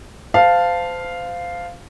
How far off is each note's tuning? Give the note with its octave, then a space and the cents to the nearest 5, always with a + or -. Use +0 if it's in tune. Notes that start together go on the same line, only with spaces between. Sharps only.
C5 -30 F5 +0 A5 +0